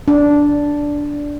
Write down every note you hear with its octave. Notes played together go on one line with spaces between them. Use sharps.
D4